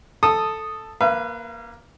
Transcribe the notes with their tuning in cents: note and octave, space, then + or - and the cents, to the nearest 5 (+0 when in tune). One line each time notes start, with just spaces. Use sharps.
A4 +0 D#6 -5
A#3 +10 B4 +0 F5 -45